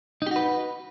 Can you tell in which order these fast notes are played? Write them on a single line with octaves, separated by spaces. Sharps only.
D#4 G4 F#4 B4